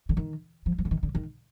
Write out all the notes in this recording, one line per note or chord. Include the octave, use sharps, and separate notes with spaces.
D3
D#3
F3
F3
D3
D#3
D3
D#3